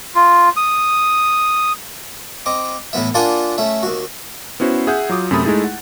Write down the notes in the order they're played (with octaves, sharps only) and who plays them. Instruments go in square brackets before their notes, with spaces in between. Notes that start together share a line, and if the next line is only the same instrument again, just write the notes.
[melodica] F4
D#6
[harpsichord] C4 D#5 D6
A2 E3 B3 E5
A#3 D4 F4 D5 F#5 G#5
A3 C#4 E5
D#2 F#4
[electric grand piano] B3 C#4 E4 F#4 C5
G#4 E5 F#5 G6
F#3 F4 D6 D#6
F#2 C3 A3 B5 D#6 A6
G#3 A3 D#4 E4 G#4
F#5